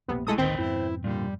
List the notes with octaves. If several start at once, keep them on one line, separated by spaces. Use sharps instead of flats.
E1 A#1 C3 A#3 B3
G#3 A3 E4 A4 D#6
A1 D2 A2 D#3 C4 B4 C5 G5
F2 G#2 B2 E4
A#2 D3 G3